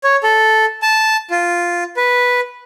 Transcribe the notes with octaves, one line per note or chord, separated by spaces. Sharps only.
C#5
A4
A5
F4
B4